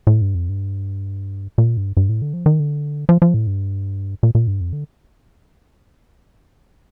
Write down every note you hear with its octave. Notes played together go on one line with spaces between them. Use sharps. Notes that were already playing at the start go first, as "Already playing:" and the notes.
A2
G2
F2
G2
A#2
G2
G2
A2
D3
F3
D#3
D3
F3
F3
A2
G2
A#2
A#2
G2
F2
D3